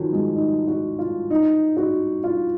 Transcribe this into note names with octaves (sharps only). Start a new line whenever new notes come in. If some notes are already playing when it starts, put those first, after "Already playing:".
Already playing: D#3 F3 F#3
G#3
D#4
F#4
F4
D#4
F#4
F4